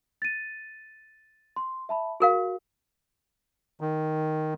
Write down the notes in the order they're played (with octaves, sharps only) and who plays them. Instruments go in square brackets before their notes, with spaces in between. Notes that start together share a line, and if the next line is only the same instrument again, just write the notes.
[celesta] A6 D#7
C6
E5 A5 B5
[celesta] F#4 [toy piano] G#4 A#4 F5
[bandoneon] D#3